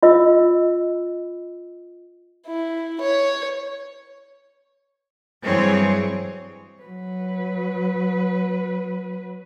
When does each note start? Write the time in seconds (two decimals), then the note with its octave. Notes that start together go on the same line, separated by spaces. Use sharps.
0.03 F4 D#5 E6
2.47 E4
3.00 C#5
5.44 G2 E3 F#3 C4 G#4 C#5
6.82 F#3 B4